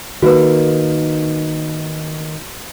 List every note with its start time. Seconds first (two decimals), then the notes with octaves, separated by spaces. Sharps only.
0.22 D#3 A#3 D#4 F#4 B4